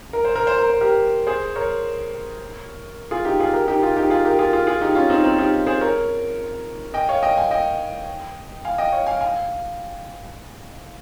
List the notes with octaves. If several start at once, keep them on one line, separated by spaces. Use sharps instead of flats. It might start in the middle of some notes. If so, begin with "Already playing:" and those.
A#4
C5
A#4
C5
A#4
C5
G4 A#4
G#4 C5
A#4 C#5
F4 G#4
D#4 G4
F4 G#4
G4 A#4
D#4 G4
F4 G#4
D#4 G4
F4 G#4
G4 A#4
F4 G#4
F4 G#4
F4 G#4
D#4 G4
C#4 F4
C4 D#4
C4 D#4
D#4 G4
G#4 C5
A#4 C#5
D#5 G5
C#5 F5
D#5 G5
F5 G#5
D#5 G5
F5 G#5
D#5 G5
C#5 F5
F5 G#5
F5 G#5